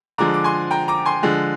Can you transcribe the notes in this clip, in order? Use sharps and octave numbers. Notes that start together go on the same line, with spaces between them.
D3 F3 G#3 A#5 D6
D6
G#5 C6
G5 A#5
A#5 D6
G#5 C6
D3 F3 G#3